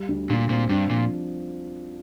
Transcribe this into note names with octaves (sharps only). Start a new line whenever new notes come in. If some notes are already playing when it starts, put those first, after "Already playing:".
Already playing: G3
D2
D2 A#2
A#2 C4
G2 D4
A#2 F3